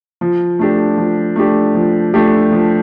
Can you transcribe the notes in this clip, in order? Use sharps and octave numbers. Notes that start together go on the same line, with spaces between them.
F3
A3 D4 G4
F3
A3 D4 G4
F3
A3 D4 G4
F3